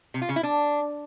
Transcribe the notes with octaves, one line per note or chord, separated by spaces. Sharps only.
C3
F4
C#3
E4
D4